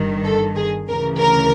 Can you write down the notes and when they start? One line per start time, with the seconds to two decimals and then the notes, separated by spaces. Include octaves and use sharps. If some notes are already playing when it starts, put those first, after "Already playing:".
Already playing: G1 G2 D#3
0.24 A4
0.56 G#4
0.88 D2 C#3 E3 A#4
1.20 A#4